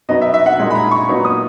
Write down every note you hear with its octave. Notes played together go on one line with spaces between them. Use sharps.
B2 F#3 B3 D#4 D#5
E5
E5
F#5
A#2 G#3 D#4
B5
A#5
C#6
A#2 F#3 B3 D#4
D#6